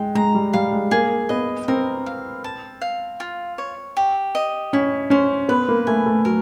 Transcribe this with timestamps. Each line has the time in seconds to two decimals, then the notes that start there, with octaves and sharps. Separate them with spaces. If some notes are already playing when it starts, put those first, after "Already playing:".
Already playing: G#3 G5
0.15 G#3 A#5
0.35 G3
0.53 G3 F5
0.73 G#3
0.91 A#3 G#4
1.29 B3 D#5
1.68 C4 A#4
2.06 F5
2.44 A5
2.81 F5
3.20 F4
3.58 C#5
3.97 G4
4.35 D#5
4.73 C#4 E4
5.10 C#4 C5
5.49 B3 B4
5.69 A#3
5.87 A3 G#5
6.06 A3
6.25 F#3 A#4